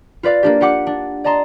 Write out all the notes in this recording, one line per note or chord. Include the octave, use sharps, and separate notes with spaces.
F4 B4 D5 F5
A#3 D4 G4
F4 G4 F#5 D6 C#7
D4
D5 D#5 A5 A#5 C6